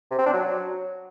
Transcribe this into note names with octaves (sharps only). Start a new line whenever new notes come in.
C3
C4
D4
F#3